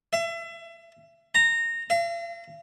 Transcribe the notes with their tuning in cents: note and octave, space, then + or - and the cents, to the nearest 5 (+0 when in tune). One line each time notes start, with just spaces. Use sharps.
E5 +30
A#5 -15
F5 -45